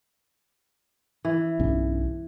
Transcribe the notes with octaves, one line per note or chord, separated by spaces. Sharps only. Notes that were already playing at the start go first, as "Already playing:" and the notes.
E3
B1 G2 C#4